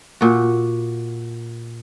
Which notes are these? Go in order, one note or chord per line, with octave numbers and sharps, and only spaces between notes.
A#2 F#4